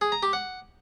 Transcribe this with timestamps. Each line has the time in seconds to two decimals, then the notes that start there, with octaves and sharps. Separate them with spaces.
0.01 G#4
0.12 A#5
0.23 G4
0.33 F#5